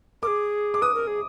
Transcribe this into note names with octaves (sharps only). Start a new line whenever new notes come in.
G#4 A#4 D6
D6
B4 D#6
A#4
G#4